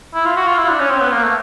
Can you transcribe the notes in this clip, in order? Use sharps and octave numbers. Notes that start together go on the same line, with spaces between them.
E4
F4
F#4
F4
E4
D4
C#4
C4
B3
A#3
A3